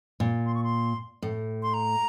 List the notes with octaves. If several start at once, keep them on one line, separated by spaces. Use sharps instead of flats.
A#2
C6
C#6
C6
A2
C6
A#5